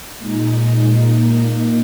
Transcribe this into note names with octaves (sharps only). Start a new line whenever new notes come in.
A#2 G#3 D#4
A#2 A#3 D#4